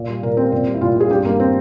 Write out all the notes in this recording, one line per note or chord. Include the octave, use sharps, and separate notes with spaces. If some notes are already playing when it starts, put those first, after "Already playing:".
Already playing: A#2
G3
A#2 A#4
G3 C4
A#2 C4
G3
E4
A#2 F4
G3 G#4
G2 G4
G3 A#3
C4